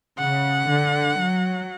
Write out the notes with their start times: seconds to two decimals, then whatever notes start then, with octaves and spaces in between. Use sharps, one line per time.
0.18 C#3 F#5
0.69 D3
1.19 F#3